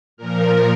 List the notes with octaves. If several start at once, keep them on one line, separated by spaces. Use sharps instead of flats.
A#2 F3 A#4